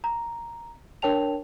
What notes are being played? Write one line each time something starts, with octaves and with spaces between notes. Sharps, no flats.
A#5
D4 A#4 C#5 G5 A5 F7